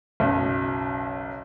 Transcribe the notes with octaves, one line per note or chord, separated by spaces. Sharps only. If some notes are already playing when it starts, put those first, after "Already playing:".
F#1 B1